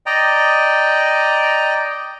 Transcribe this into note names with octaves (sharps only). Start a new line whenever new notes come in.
D5 D#5 G5 A#5